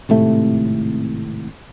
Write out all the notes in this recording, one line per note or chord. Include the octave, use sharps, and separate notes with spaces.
G#1 A2 C3 A3